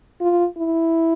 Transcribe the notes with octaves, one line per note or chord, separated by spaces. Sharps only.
F4
E4